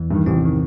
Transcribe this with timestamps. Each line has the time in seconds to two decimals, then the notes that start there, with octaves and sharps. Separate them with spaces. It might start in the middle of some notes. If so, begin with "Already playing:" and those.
Already playing: E2 E3
0.11 G2 D#3
0.26 A1 C3 C4
0.45 D#3